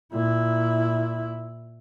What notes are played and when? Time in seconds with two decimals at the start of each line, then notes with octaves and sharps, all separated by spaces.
0.12 A#2 E4